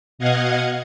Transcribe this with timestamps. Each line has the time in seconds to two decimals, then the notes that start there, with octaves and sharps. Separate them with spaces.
0.19 B2 D#5 F5 F#5 G#6